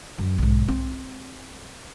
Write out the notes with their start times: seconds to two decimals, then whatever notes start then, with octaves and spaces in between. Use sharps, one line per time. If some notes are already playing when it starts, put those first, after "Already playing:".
0.18 F#2
0.38 B1 G#2
0.68 C4